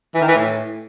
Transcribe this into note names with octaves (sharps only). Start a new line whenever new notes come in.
E3
D#3
E3
A2